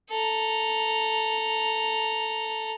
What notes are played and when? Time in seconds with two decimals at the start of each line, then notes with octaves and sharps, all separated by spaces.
0.10 A4 A#5